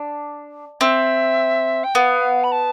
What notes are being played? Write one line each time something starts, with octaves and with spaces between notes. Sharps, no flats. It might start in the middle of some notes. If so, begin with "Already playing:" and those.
Already playing: D4
C4 E5
G5
B3 F5
B5
A5